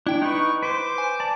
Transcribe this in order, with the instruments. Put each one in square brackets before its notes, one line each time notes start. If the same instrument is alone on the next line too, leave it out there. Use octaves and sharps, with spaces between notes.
[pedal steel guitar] D4 [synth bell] E4 G5 D7
[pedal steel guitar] D#4 B4 [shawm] C#6
[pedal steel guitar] B4 C5 [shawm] D6
[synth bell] G#5
[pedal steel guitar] D5 A5